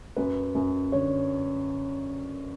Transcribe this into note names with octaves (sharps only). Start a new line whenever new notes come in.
F#2 B4
F#2
D3 C#5